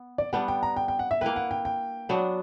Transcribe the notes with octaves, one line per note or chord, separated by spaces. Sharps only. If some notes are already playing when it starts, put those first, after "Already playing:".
Already playing: B3
D5
G3 B3 D4 F#5
G5
A#5
G5
G5
F#5
E5
A#3 E4 B4 G5
F#5
G5
G5
F#3 B3 D4